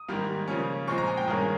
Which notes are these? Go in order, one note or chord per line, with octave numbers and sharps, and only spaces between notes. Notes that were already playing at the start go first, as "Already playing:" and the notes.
Already playing: D#6
G#2 D#3 G3 A#3
C#3 F3 A#3 C#4
A#2 F3 G#3 C4 C#6
A#5
G#5
G5
G2 D#3 A#3 C#4 G#4